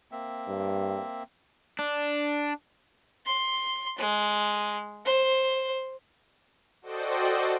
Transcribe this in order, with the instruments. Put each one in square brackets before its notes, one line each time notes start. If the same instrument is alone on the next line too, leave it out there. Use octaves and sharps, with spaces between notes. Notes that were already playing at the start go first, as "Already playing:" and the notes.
[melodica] A#3 C4 E5
[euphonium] G2
[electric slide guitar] D4
[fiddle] C6
G#3
C5
[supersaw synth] F#4 A4 C5 D5 D#5 G5